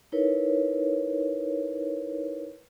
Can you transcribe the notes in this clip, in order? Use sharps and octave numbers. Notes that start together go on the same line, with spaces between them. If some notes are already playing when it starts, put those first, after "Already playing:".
D#4 E4 A#4 B4 C#5